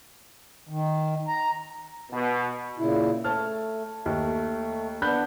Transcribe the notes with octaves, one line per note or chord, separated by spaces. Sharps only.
D#3
A#5
B2
A#2 C#3 E4
A3 C#5 A5 F6
D#2 A3
B3 D4 B5 F#6 G6